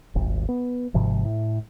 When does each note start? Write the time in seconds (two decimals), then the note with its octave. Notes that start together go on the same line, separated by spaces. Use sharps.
0.15 D#1 G#1
0.49 B3
0.94 G#1 G#2 C3 F3
1.25 A2